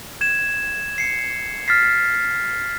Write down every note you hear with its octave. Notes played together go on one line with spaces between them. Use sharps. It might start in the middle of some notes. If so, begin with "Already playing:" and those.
G#6 E7
C7 C#7
F6 A6 B6 C7